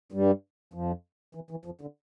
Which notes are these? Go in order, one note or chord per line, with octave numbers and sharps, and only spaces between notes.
G2 G3
F2 F3
E3
E3
F2 F3
D3